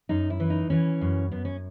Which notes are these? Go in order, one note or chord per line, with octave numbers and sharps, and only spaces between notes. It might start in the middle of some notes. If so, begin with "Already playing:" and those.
F#2 D#4
E4
E3
D#4
E3 C#4
F#2
F#2 B3
C#4